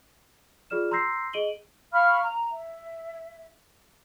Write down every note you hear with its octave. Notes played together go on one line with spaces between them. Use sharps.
F4 G#4 D5 F6 E7
A#5 C6 E6 G6 A#6 C7
G#4 D#5 D7 D#7 F#7 G7
F5 B5 C#6 F6
A#5
E5